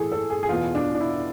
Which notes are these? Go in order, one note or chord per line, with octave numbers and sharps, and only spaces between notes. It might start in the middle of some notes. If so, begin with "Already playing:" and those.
Already playing: A2 E3 G#4 A4
A4
G#4
G#4
E2 B2 F4
D4
D4
E4